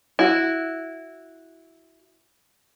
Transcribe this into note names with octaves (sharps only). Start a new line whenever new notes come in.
E4 F#4